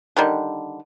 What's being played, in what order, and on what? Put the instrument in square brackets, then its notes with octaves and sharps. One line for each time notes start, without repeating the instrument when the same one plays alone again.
[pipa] D3 D#3 G3